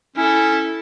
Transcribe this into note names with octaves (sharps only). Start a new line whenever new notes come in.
C#4 E4 A4